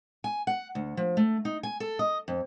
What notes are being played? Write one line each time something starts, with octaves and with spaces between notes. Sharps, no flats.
G#5
F#5
D2
F3
A3
D#4
G#5
A4
D#5
F2